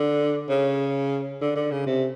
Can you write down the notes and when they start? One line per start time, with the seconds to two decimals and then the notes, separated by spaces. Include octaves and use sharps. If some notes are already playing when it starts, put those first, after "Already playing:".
Already playing: D3
0.49 C#3
1.41 D3
1.56 D3
1.71 C#3
1.86 C3